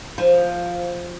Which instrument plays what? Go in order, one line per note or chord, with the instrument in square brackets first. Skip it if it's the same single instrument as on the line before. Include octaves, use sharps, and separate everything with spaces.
[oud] F3